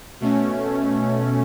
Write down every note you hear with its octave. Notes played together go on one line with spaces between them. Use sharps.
B2 A3 C#4